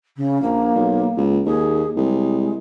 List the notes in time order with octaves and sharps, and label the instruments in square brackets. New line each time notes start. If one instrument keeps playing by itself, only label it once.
[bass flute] C#3
[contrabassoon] A#1 [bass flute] A#3
[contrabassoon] B1
C#2
[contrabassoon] D#2 [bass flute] G#4
[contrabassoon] C2 [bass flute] G#3